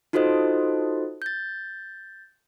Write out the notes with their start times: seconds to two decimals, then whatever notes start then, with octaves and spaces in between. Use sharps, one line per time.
0.13 D#4 F4 F#4 A4 C5 D#5
1.22 G6 A6